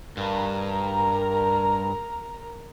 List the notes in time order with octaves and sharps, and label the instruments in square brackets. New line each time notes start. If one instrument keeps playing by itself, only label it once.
[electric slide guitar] G2 [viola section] A#4 A#5